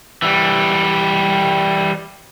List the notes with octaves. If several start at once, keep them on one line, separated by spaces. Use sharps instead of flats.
E3 G3